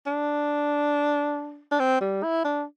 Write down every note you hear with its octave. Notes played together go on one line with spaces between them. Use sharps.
D4
D4
C4
G3
E4
D4